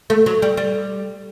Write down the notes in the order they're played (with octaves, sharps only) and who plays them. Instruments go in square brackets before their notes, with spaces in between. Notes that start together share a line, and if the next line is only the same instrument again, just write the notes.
[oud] A3
F#3
G3
G3